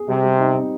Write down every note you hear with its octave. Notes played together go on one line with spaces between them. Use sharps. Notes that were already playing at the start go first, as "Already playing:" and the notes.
Already playing: G#4
C3 G3
G3
D#4
C4